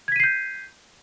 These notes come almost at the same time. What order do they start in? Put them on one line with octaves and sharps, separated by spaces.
G#6 B6 D#7 C7 G6